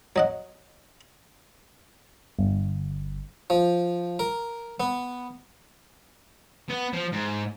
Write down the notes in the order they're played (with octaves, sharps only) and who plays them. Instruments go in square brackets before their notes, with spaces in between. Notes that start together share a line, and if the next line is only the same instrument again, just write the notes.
[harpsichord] F#3 D#5 F#5
[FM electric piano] G1
[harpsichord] F3
A#4
B3
[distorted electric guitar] B3
F3
G#2